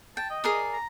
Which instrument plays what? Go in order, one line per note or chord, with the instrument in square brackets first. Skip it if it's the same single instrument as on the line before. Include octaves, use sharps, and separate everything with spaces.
[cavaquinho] G5 [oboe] A5
[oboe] D#5
[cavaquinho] G#4 A#4 D5
[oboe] A#5